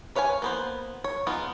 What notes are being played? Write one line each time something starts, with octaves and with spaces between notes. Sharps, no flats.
B4 C#5 F5 F#5 G#5
A#3 B3 C5
C#5
G#3 B3 D#4 F4